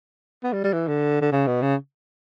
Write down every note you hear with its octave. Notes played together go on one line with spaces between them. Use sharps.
B3
G3
G3
E3
D3
D3
C#3
B2
C#3